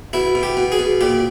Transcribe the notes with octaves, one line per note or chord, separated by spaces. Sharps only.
B2 E4
B2
G4
B2
G#4
B2
A#2 G4